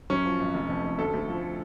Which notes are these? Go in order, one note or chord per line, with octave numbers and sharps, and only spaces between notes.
F#2 C#4
F3
G#1
F1
F2
F1
D2 A4
D2
F3